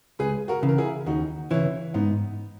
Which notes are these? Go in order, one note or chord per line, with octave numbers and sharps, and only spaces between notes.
C#2 G#4 B4
F#4 A#4
C#3 E3
A#4
E4 G#4
D#2 D#4 F#4
C#3 E3 C#4 E4
G#2 B3 D#4